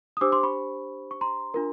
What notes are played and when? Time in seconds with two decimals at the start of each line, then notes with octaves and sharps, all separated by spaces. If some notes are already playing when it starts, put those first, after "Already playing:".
0.17 D#6
0.21 D4 G4 C5 D6 E6
0.32 C6 D6
0.43 B5 C#6
1.11 C#6
1.21 A#5 C6
1.54 D4 F4 A#4